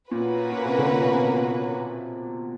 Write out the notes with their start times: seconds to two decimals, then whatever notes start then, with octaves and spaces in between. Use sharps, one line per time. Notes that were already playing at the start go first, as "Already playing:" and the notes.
0.11 A#2 A#3 C#4 F#4 B4
0.52 A#2
0.66 C3
0.79 D3
0.92 A#2
1.03 B2
1.13 C3
1.23 B2
1.33 A#2